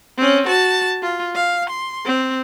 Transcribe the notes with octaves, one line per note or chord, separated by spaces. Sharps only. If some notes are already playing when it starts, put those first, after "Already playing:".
C4 C#4
F#4 A5
F4
F5
C6
C4